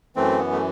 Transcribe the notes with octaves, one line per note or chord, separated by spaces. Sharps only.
F#2 E3 A3 C4
B3
A3